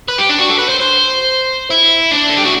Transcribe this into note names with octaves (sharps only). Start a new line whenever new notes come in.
B4
G4
D4
F#4
A4
B4
C5
C5
E4
D4
A4
G4
F#4